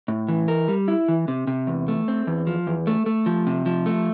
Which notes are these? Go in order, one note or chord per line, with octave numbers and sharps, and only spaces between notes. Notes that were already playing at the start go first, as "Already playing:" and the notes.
A2
E3
A#4
G3
E4
E3
C3
C3
E2
A3
C4
E2
F3
E2
A3
A3
F3
C3
F3
A3